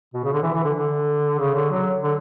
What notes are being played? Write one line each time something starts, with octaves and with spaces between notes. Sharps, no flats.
B2
C#3
D3
E3
E3
D3
D3
C#3
D3
F#3
D3